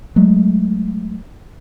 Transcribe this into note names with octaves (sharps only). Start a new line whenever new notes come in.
F#3 G#3 A3